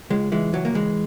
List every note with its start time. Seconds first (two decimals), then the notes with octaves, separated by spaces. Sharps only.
0.10 C#2 G#3
0.32 E3 G#3
0.53 C#2 F#3
0.65 A#3
0.75 E3 G#3